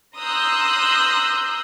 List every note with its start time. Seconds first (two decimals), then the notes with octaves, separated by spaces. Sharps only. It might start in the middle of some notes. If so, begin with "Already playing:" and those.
0.17 A#5 C6 D#6 E6 F#6 G6